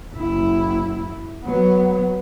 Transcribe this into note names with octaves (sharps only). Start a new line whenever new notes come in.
F#1 E4
F#3 B3